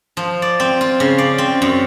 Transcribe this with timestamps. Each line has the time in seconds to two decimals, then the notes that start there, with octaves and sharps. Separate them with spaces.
0.17 F3
0.42 D5
0.60 C4
0.81 F4
1.00 C#3
1.18 D5
1.38 C4
1.62 F#2